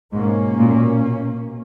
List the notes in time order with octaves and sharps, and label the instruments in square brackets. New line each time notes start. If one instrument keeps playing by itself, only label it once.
[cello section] G#2 [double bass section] B2 A#3 C#4
[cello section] A#2